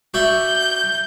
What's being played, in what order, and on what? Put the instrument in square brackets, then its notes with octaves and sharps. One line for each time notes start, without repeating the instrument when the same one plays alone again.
[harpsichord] F#4 D5 E5 [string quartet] G6